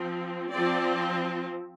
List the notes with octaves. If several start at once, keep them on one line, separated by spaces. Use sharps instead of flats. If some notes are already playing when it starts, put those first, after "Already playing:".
Already playing: F3 C4
F3 C4 D5